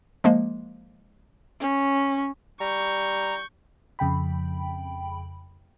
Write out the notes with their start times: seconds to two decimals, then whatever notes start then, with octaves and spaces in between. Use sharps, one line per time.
0.24 F3 G#3 A#3
1.61 C#4
2.60 G3 A#5 C#6 G6
3.99 F2 C#3 G5 B5